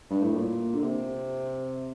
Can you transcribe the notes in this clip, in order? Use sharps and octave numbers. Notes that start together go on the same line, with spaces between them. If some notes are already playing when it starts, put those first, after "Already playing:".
G2
A2
A#2
D3
C3